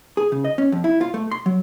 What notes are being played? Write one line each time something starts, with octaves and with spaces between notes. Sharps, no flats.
G#4
C#3
D#5
C#4
F2
E4
F4
A3
C6
F#3